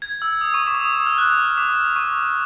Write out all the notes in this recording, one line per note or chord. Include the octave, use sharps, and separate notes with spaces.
G#6
E6
D#6
C#6
D6
D#6
D6
D#6
F6
F#6
D6
C#6